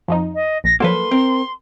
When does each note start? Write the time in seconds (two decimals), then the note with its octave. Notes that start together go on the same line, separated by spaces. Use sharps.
0.08 F2 F3 D#4
0.34 D#5
0.64 A#1 A#6
0.80 F3 F#3 A#3 A4 B4 C6
1.11 C4 A#4